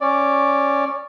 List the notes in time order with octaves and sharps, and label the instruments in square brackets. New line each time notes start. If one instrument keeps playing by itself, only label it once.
[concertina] C#4 D5